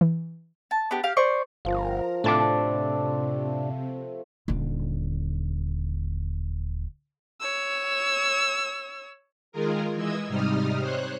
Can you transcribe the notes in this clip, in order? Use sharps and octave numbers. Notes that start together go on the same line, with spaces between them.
E3
A5
B3 D4 G4
G4 F5
C5 D5 C#6
G1 F3 A#4 F5 A#5
A2 C3 A3 C4 D4 A5 D6
D#1 D3
C#5 E6
D#3 G#3 F4 G#4 A#4
E3 G#3 D#5 E6 G#6
G#2 C3 G3 D#4 D#6 F6
C5 C#5 F#6